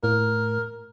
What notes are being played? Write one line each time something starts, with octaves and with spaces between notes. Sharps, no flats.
A2 A#4